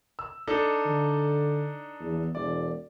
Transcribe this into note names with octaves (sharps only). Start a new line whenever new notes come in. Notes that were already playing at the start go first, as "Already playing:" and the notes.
E6
D4 D#4 A4
D3
E2
E1 D5